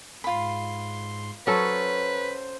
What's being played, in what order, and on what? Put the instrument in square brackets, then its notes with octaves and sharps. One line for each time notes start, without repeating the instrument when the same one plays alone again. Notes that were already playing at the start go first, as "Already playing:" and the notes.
[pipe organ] G#2 C6 [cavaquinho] F4 B5
[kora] F#3 C#4 A4 [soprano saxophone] B4 [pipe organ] C5